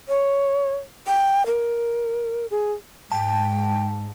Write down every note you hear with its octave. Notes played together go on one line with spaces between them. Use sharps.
C#5
G5
A#4
G#4
G#2 G5 A5